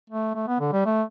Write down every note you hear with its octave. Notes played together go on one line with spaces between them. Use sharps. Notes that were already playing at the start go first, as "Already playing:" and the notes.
A3
A3
B3
D3
G3
A3